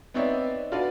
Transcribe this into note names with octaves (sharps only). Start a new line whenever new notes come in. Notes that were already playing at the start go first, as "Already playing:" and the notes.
B3 C4 D#4 C#5 D5 E5
D4 F4 F#4 A4 B4 D5